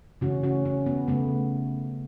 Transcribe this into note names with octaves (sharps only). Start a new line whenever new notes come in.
C#3 E3 A3 C#4 F#4
C#4 F#4
C#4
B3
C#3 A3 B3